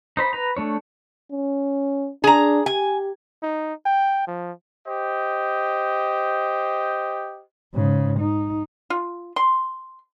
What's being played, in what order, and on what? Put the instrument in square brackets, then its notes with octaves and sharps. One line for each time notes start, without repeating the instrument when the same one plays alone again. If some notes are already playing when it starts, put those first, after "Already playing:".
[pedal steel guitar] D#4 C5 B5
B4 A#5
A3 D4 C#5
[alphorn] C#4
[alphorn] D4 [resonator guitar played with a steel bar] G#4 A#5
[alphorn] G4 [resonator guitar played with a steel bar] G#5
[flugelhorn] D#4
G5
F3
[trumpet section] G4 C5 D#5
[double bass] G#2 C#3
D#4
[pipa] F4
C6